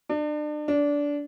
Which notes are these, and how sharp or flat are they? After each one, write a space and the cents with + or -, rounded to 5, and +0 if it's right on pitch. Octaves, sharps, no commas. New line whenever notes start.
D4 +35
D4 -20